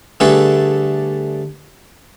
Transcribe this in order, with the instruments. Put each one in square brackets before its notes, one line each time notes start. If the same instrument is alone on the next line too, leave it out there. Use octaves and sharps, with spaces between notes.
[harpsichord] D3 G3 A3 G#4 A4 B4